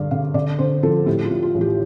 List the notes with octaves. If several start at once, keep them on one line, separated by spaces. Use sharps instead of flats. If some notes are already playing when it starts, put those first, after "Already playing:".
Already playing: G2 D3 D5 F5
D3 F5
D3 D5
D3 C5
F3 A4
A2 G4
F4
A2
F4
A1
G4